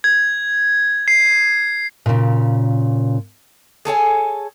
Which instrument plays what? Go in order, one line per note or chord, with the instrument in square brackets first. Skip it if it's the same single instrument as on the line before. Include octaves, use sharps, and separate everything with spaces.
[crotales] G#6
C7
[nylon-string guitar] A#2 C#3
[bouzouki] G#4 A4 C#5 G#5